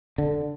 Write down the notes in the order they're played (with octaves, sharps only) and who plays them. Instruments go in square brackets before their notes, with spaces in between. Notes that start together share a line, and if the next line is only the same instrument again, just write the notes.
[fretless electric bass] D3